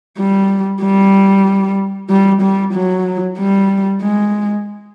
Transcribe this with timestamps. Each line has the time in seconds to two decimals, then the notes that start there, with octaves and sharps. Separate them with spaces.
0.18 G3
0.82 G3
2.10 G3
2.42 G3
2.74 F#3
3.38 G3
4.02 G#3